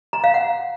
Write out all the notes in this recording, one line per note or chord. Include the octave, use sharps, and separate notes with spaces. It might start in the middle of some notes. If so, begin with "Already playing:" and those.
A#5
F5
F#5